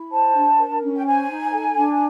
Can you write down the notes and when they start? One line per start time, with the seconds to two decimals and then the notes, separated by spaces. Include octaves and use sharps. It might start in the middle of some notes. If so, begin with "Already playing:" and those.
Already playing: E4
0.10 C5 A5
0.34 D4
0.58 A#4
0.82 C#4
0.95 G5
1.05 C5 G#5
1.29 D#4
1.53 A4
1.77 D4